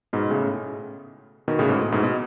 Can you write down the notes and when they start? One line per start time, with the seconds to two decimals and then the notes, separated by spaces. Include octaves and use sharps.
0.13 G#2 B2
0.30 A2 C#3
1.48 B2 D#3
1.59 A2 C#3
1.69 G#2 B2
1.82 A2
1.92 G#2 B2
2.04 B2